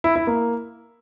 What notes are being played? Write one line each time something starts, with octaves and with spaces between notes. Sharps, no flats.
E4
E4
A#3